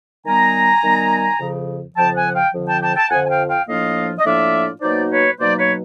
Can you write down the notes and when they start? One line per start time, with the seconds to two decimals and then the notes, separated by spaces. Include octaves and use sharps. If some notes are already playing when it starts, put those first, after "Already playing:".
0.25 D#3 G3 B3 G#5 A#5
0.82 D#3 G3 B3
1.40 F2 C#3 F3
1.96 F2 C#3 F3 G5 A5
2.16 F#5 G#5
2.34 F5 G5
2.54 F2 D3 F3
2.68 G5 A5
2.82 G5 A5
2.96 G5 A5
3.11 F2 D3 F3 F#5 G#5
3.25 G#5
3.30 F5 G5
3.49 F5 G5
3.68 A2 F3 A#3 D4 F4 D#5 F5
4.19 D#5
4.25 A2 F3 A#3 D4 F4 D5 E5
4.81 B2 F#3 A#3 D#4 C5 D5
5.10 B4 C#5
5.39 B2 F#3 A#3 D#4 C5 D5
5.58 B4 C#5